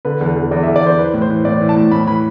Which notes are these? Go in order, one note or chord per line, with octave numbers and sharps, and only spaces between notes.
D3 B4
E2
E2
E2 D5
E5
E2
D5
E2 C5
E3 B4
A2
C5
E3
A2 D5
E3
A5
A2
A2 B5
E3 B5